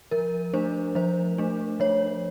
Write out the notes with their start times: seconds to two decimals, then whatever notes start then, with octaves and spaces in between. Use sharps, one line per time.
0.11 F3 A#4
0.54 A3 D4 C5
0.95 F3 C5
1.38 A3 D4
1.80 F3 C#5